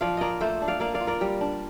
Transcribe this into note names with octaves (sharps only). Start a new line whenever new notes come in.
F3 D5 F5
A#3 A#4 D5 D#5
A3 A4 C5
D4
D5 F5
A#3 D5 F5
D5 F5
F4
A#4 D5
G3
D4